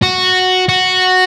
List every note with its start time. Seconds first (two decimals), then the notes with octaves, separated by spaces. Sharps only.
0.02 F#4
0.69 F#4